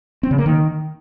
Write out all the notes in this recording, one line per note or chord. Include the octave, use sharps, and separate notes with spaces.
C4
C#3
A#3
D#3